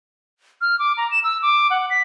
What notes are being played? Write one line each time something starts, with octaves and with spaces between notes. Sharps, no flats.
F6
D6
A#5
E7
E6
D6
F#5
B6